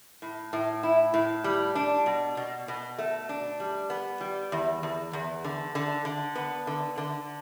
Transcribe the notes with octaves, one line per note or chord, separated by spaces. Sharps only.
A2
A2
E4
A2
G3
D4
B2
B2
B2
A3
D4
G3
B3
G3
E2
E2
E2
D3
D3
D3
B3
D3
D3